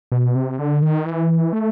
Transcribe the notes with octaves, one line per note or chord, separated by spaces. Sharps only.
B2
C3
D3
D#3
E3
A3